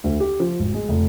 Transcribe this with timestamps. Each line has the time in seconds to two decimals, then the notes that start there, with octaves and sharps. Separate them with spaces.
0.04 D2
0.20 G4
0.40 F3
0.59 G#1
0.74 G#3
0.89 F1